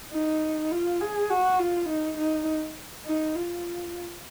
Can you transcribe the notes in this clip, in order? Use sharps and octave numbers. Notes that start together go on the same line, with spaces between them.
D#4
F4
G#4
F#4
F4
D#4
D#4
D#4
F4